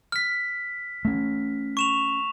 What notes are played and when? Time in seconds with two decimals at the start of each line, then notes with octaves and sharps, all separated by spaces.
0.12 F6 B6
1.05 A3 C#4
1.77 C#6 E7 F7